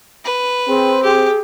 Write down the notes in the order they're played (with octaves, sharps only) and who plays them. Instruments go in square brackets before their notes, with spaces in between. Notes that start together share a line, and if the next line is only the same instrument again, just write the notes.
[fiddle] B4
[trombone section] C4 [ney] G#4
[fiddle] G4 [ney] G#4